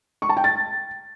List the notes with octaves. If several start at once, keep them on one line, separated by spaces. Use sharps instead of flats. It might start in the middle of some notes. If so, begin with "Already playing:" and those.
C#6
A5
G5
A6